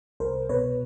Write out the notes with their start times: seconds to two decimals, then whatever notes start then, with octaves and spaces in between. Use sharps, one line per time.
0.20 C2 A#4 C5
0.49 B2 B4 C#5